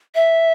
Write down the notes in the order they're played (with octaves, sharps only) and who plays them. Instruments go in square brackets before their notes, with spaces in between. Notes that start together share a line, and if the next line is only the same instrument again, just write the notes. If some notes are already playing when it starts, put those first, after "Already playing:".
[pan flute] E5